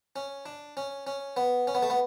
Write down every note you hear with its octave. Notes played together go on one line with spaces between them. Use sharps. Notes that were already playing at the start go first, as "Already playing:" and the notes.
C#4
D4
C#4
C#4
B3
C#4
B3
A3
B3